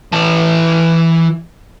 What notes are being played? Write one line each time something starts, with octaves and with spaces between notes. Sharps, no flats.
E3 A5